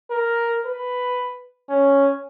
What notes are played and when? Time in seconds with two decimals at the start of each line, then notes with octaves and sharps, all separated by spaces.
0.11 A#4
0.66 B4
1.69 C#4